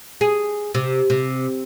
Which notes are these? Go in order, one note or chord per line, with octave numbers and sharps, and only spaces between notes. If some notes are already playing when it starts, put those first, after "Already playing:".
G#4
C3
C3